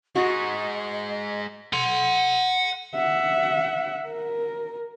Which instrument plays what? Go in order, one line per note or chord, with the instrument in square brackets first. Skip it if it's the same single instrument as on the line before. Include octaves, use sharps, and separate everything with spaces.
[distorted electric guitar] G#3 D#4 [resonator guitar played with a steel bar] F#4 [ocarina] D#5
[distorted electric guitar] F#5 C6
[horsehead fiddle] E5 F#5
A#4